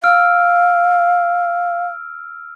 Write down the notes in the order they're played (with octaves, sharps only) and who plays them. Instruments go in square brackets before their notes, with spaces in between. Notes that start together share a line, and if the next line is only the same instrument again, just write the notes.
[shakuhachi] F5 [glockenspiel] E6 F6 D7